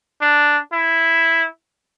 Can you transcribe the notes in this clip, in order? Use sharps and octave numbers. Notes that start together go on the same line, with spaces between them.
D4
E4